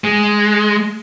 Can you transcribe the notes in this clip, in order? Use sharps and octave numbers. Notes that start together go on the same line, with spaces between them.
G#3